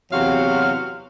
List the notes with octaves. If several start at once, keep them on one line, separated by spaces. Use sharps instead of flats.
E2 C3 F#3 F#4 F5